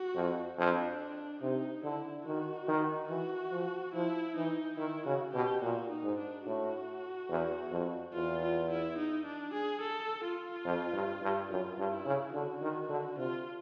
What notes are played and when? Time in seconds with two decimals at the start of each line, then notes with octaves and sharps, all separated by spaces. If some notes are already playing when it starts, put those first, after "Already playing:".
Already playing: F#4
0.15 F2
0.58 F2 D4
1.41 C3 D#4
1.83 D3 E4
2.25 D#3 F#4
2.68 D#3
3.09 E3 F#4
3.51 F3
3.94 F3 E4
4.36 E3 D#4
4.77 D#3 E4
5.06 C#3 F#4
5.34 B2 G4
5.62 A#2 F#4
5.89 D#4
6.04 G#2
6.18 D4
6.46 A2 F#4
7.29 E2
7.71 F2
8.13 E2 F4
8.42 F4
8.70 E4
8.98 D#4
9.25 D4
9.54 G#4
9.81 A4
10.24 F4
10.65 F2
10.93 G2
11.22 G2
11.49 F#2 F4
11.78 G2
11.92 E4
12.06 C#3
12.33 D3 F#4
12.62 D#3
12.89 D3
13.17 C3 F4